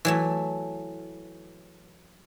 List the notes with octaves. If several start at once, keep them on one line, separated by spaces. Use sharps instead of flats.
E3 F#3 A3